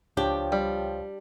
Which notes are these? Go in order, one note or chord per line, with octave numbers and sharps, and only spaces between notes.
C#2 F3 D4 G4 C#5 G5
G3